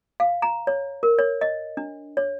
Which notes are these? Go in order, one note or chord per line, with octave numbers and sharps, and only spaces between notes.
F5
A#5
C#5
A#4
C#5
D#5
D4
C#5